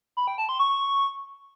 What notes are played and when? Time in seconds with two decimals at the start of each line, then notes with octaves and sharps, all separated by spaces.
0.17 B5
0.27 G5
0.38 A5
0.49 C6
0.59 C#6